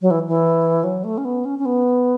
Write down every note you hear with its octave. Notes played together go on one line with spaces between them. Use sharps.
F#3
E3
E3
F#3
A3
C#4
B3
C#4
C#4
B3